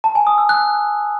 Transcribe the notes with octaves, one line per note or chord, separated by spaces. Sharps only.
A5
G#5
D#6
E6
F#6